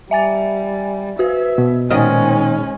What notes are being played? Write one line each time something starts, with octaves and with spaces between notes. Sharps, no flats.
G3 E5 G#5 A6
F#4 B4 E5
B2
A#2 D#3 G#3 C#4 C5 D#5 F6